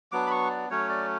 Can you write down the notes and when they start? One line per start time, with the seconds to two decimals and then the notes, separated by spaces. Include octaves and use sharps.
0.12 F#3 B3 D4 D6
0.27 B5
0.31 C#6
0.50 D5
0.70 F#3 A3 C#4 C#5
0.89 D5